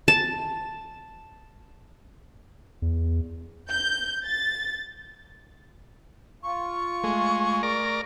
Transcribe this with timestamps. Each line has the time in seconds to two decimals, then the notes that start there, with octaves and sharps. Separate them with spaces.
0.08 A5
2.82 E2
3.71 G6
4.25 A6
6.43 F4 C#6
7.04 G#3 A3
7.63 A#4 D5